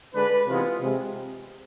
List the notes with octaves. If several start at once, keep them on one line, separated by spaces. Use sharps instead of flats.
D3 G#3 D4 B4
C3 E3 G#3 B3 F4
C3 G#3